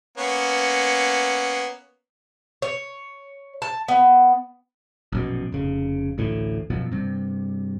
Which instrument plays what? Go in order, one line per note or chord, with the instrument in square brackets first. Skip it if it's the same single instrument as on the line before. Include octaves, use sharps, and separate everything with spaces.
[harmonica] A#3 B3 C#4
[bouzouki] C#5
A5
B3
[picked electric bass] A#1 F#2 B2
F1 C#3
A1 D2 A2
F#2 B2 F3
G2 C3